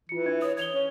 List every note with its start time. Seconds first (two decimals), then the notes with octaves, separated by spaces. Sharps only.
0.09 E3 F4 C#7
0.26 D4 E5 G#6
0.42 C#5 D#6
0.57 C#5 G#6 F7 G7
0.72 C#4